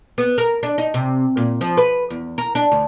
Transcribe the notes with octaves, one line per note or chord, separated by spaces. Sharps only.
B3
A#4
D4
D#4
C3
A#2
F3
B4
E2
A#4
D4
D2